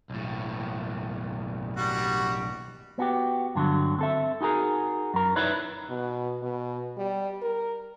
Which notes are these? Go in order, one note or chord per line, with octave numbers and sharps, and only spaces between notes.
B1 A2
G3 F#4
B3 F#4 G4
G2 D3 F3 F#3
C4 A4 E5
D#4 F#4 G#4 A#4
F#2 A#4
D#4 E4 B4 C#5 D5
B2
B2
G3
A#4